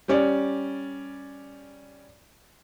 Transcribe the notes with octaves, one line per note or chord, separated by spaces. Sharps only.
G3 C#4 D5